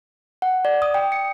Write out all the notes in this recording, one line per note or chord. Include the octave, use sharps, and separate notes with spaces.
F#5
D5
D#6
G5
C#7